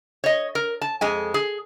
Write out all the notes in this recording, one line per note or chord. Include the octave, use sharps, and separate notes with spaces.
C#5 D#5
A#4
A5
F2 G#3 G#5
G#4